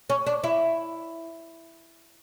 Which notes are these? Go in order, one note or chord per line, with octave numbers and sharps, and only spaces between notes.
C#4
D4
E4